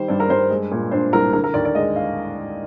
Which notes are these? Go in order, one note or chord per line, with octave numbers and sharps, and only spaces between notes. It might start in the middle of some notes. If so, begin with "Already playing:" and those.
Already playing: D#3 G3 C5
G2 D5
A#4
G2 C5
G#3
A#2
D4 C5
C2 A#4
D3 A#4
A#4
D#2 D5
D5
G#3 D#5
F5